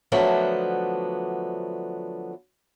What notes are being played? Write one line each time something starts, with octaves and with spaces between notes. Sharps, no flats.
D3 F3 F#3 A3 B3 D4